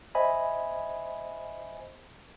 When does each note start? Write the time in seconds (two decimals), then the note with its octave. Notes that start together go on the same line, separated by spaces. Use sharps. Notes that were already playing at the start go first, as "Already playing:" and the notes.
0.15 C5 D#5 E5 G#5 B5